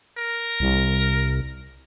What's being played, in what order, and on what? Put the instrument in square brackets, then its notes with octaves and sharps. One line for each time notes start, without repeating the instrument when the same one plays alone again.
[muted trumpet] A#4
[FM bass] C2